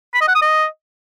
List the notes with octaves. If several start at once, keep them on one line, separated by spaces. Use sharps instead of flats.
B5
D#5
F#5
D#6
D#5